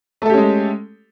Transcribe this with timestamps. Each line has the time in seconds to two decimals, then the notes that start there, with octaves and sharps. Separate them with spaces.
0.22 A3
0.26 A4
0.29 G4
0.33 C#4
0.37 G#3